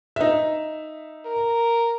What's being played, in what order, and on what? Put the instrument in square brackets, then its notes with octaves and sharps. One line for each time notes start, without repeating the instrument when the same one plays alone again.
[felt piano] D#4 E5
[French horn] A#4